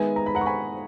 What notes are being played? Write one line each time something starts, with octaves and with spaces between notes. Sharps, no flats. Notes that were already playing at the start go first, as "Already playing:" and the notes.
Already playing: D#3 G#3 B3 E5 G#5
A#5
B5
F#5 A#5
C#6
G#5 B5